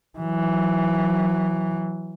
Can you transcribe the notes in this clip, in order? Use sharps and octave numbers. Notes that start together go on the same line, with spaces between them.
E3 F#3